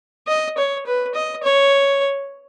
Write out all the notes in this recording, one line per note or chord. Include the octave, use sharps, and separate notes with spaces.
D#5
C#5
B4
D#5
C#5